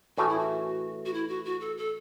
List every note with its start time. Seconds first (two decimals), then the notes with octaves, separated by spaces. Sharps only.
0.17 A2 E3 A3 C#4 F#4 G#4
0.29 E4
0.39 F#4
1.06 F#4
1.14 E4
1.29 F#4
1.45 F#4
1.61 A4
1.77 A4